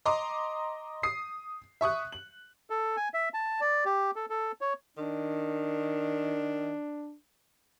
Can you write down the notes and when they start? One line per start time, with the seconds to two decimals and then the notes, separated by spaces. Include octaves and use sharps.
0.06 D#5 A#5 C6 D6
1.03 D#6 C7
1.81 E5 C#6 D#6 F#6
2.12 F#7
2.70 A4
2.97 G#5
3.14 E5
3.34 A5
3.61 D5
3.85 G4
4.16 A4
4.30 A4
4.61 C#5
4.97 D#3 D4